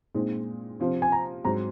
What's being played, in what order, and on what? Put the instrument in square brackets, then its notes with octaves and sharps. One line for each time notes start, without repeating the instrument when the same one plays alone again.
[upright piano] A#2 G#3 C4 D#4
C3 F3 C4 F4
[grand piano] G#5
A#5
[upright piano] G#2 F#3 C4 [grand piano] A#5